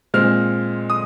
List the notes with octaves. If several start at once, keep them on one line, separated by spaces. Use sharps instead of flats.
A#2 G#3 C4 F6
D#6